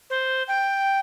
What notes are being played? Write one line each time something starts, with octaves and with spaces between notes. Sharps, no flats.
C5
G5